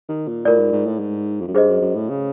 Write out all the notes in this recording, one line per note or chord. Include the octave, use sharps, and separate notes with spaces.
D#3
A#2
A2 F4 A#4 D5
G#2
G#2
A2
G#2
F2
F#2
G2 G#4 C5 D#5
F#2
F#2
A2
C#3